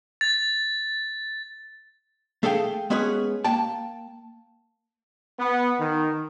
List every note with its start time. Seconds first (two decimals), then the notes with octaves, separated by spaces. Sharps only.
0.21 A6
2.43 A3 G#4 A4 F5 G5
2.90 G#3 B3 C#4 G#4 B4 C#5
3.45 A#3 G5 A5
5.39 B3
5.79 D#3